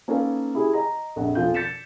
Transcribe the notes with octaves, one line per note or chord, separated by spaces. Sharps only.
A#3 C#4 D#4 A4 B4 F5
E4 G4 G#4
D#5 A#5
A#1 F2 F#5
B1 F2 F3 F4 G6
G6 A6 B6 C#7 E7